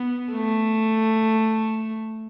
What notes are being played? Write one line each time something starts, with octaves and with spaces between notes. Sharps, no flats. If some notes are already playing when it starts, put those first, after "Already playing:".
Already playing: B3
A3